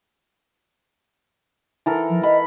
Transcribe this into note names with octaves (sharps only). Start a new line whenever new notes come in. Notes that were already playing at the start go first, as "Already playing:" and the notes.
E3 A4 A#4
F3
D#5 B5